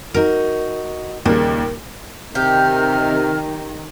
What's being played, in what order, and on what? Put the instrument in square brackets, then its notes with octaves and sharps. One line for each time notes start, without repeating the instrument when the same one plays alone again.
[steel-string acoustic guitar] D#4 F#4 [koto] A#4
[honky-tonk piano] D#2 C#3 G3 [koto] A#2 [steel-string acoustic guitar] A#3
[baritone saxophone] C3 [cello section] D#3 [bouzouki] G4 [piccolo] F6